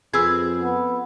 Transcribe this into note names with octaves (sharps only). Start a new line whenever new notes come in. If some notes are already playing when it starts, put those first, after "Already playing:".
F2 C4 G#4 B4 E6 G#6
B3